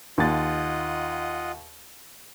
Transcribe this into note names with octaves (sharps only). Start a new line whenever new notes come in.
D#2 F4 D#5 F#5 A6